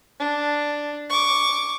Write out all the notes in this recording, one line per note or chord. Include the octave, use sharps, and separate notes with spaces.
D4
C#6 D6